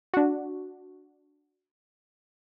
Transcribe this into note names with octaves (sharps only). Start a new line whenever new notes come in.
D4 F#4